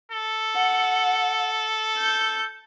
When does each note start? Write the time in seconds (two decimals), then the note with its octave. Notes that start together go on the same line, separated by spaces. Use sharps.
0.11 A4
0.55 F#5
1.98 G6